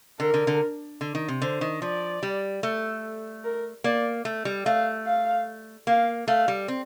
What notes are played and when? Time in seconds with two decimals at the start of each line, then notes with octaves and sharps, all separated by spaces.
0.20 D3 A#4
0.34 D3
0.47 D3
1.01 D3
1.15 D#3
1.28 C3
1.42 D3 C5
1.61 D#3
1.82 F3 D5
2.23 G3
2.63 A3
3.44 A#4
3.84 A#3 D5
4.25 A3
4.45 G3
4.66 A3 F5
5.06 F5
5.87 A#3 F5
6.28 A3 F5
6.48 G3
6.68 C4